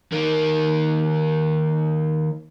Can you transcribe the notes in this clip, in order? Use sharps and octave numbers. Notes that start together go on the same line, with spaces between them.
D#3 A#3